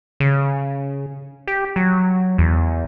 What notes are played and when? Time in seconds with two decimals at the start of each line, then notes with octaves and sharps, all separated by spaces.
0.20 C#3
1.47 G4
1.76 F#3
2.38 E2